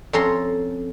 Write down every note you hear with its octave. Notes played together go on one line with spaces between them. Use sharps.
F2 C#4 A4 A#5 C6